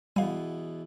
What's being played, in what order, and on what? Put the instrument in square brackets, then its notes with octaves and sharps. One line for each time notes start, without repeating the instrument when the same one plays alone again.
[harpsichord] E2 B2 G#5 [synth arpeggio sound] G3 F5